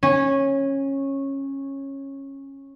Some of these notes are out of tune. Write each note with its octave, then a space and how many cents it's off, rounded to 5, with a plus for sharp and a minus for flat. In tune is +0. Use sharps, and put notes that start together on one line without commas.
C#4 -15